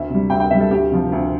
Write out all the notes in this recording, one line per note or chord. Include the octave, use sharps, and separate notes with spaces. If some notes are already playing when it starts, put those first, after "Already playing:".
Already playing: D2 E5
C3 G3
D2 G5
G5
C3 G3 E5
A4
D2 G4
C3 F3
D2